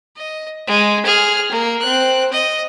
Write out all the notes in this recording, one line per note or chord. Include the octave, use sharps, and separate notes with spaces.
D#5
G#3
G#4 F6
A#3
C4 F#6
D#5